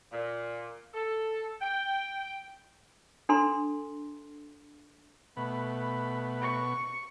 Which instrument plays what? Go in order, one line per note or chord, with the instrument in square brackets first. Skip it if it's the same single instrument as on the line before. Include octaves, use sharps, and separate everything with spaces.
[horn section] A#2
A4
G5
[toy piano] D4 A4 A#5 C6
[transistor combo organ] B2 [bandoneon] A3 B5
[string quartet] C#6